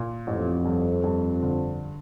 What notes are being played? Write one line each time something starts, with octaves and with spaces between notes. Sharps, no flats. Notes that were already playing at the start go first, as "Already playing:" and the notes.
Already playing: A#2
A1 F2
G2
G2
D3